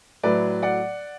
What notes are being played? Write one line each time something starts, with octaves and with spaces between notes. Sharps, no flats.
A2 F#3 A3 B4 D5
D5 F#5